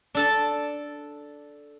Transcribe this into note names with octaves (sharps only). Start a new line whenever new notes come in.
D4 A4 A5